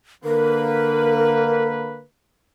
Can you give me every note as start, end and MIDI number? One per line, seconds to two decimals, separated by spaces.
0.24 2.03 50
0.24 2.03 58
0.24 1.69 70
0.24 2.03 71